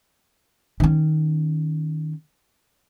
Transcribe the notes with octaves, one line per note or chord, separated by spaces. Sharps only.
D#3 C#4